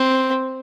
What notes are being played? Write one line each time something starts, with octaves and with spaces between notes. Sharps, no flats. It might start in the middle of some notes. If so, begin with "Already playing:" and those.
Already playing: C4